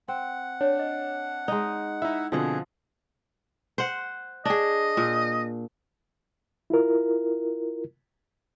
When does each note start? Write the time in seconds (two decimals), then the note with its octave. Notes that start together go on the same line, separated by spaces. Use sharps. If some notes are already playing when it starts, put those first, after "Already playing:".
0.08 C4 F#5
0.61 D4 C#5
0.79 D#5
1.48 G#3 D#4
2.02 D#4 E4 E5
2.32 B2 D3 F3 C4 G#4 D#5 F#5
3.78 C5 F#5
4.45 D4 G#4 D#5
4.97 A#2
6.70 E4 F4 A#4